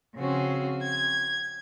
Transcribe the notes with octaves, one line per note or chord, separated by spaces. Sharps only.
C#3 F3 C4 C#4 F#4
G#6